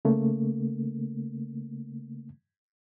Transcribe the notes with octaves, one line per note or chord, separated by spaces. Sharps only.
C#3 A3 A#3